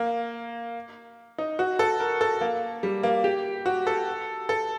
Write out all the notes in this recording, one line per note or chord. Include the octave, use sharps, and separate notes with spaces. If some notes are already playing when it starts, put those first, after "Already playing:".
Already playing: A#3
D#4
F#4
A4
A#4
A4
A#3
G3
A#3
G4
F#4
A4
A4